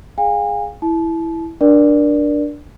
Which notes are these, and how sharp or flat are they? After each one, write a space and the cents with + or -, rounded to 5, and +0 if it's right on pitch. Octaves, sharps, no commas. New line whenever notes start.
G#4 +0 F5 +25 G#5 -40
E4 +0 A5 -30
D4 +0 A#4 +30 D5 +0